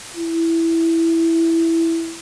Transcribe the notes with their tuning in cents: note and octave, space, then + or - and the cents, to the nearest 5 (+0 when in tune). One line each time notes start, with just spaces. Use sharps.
E4 +0